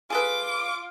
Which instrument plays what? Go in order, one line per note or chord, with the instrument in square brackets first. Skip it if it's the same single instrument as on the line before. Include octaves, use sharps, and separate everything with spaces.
[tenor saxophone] F4 [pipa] G#4 A4 B4 [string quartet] D6